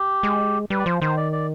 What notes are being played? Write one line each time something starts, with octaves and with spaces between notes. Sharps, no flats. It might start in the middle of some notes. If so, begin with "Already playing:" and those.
Already playing: G4
G#3
G3 B4
D5
F3 C5
D#3 C5
D5
D5